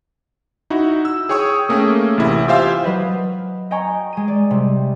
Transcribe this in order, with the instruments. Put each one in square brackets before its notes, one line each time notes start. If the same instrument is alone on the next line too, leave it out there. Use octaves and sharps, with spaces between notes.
[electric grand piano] D#4 E4 F#4
E6
G#4 C#5 G5 C#6 D#6
A3 A#3 C#4 G#4
A1 C3 E4
F4 G4 C5 E5 F5 G#5
[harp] F#3 B4 D#5
D#5 G5 G#5 A#5 C#6
G#3 D#7
D5 D#7
C3 G3